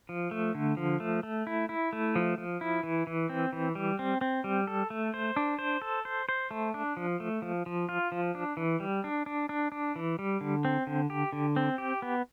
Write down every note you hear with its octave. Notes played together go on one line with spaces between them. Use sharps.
F3
A3
D3
F3
A3
A3
E4
E4
A3
F3
F3
E4
E3
E3
C4
E3
G3
C4
C4
G3
A4
A3
C5
D4
C5
A4
C5
C5
A3
D4
F3
A3
F3
F3
F4
F3
D4
E3
G3
D4
D4
D4
D4
E3
G3
D3
C4
D3
G4
D3
C4
G4
B3